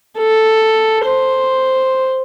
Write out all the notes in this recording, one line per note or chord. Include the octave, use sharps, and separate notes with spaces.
A4
C5